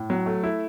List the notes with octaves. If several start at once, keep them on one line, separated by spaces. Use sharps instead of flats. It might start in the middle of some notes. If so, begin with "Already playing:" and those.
Already playing: A2
F#3
A3
E4